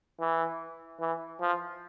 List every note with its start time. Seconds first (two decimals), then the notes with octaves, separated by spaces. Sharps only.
0.20 E3
1.00 E3
1.41 F3